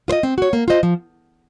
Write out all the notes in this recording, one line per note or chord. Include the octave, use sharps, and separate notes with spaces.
F4 C5 D#5
C4
F#4 C#5
A#3
F4 C5 D#5
F3